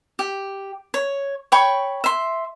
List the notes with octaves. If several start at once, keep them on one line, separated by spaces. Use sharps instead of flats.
G4
C#5
C#5 G5 B5 C#6
E5 C6